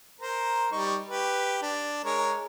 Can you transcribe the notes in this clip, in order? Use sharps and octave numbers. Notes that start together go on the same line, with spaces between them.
A#4 C5 A#5
G3 D#4 C#6
G4 B4
D4
G#3 A#4 C#5